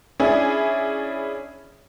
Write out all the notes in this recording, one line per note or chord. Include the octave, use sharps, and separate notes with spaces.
C#4 D4 E4 G#4